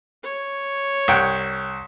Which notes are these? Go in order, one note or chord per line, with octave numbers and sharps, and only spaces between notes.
C#5
C2 F#5 G5